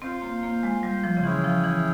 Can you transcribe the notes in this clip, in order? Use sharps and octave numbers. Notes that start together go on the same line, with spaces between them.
C4 F4 C5 F5
A#3
A#3
G#3
G3
F3
C#3
E3 C#4 E4 G#4 C#5 G5
F3
E3